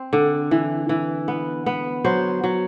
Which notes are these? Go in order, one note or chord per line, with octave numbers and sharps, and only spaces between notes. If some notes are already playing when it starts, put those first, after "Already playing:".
Already playing: C4
D3
E3
E3
B3
B3
F#3 C5
F#3